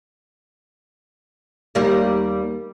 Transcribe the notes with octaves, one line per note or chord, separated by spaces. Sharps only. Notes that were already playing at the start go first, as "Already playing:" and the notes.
D#2 G3 A#3